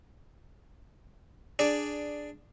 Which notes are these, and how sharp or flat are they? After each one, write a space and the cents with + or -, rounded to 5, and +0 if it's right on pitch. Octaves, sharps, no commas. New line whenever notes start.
D4 +5 G#4 +0 D5 +0